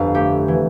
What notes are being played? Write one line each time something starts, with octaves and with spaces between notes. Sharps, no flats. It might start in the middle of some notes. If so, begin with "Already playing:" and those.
Already playing: G1 F2 F5
A3 G4
E3